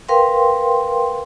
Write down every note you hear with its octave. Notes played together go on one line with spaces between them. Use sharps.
A#4 B4 F5 G5 C6